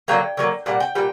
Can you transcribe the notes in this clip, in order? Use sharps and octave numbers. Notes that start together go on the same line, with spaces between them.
D3 F#3 A#3 G5
D3 F#3 A#3
A#2 G3 F#5
G5
A#2 G3 G5